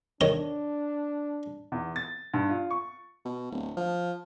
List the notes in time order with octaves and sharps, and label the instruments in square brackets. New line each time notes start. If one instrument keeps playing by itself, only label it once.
[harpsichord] D#3 C#5 D#5 [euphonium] D4
[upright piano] E2
A6
G2
F4
C#6
[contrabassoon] B2
D1
F3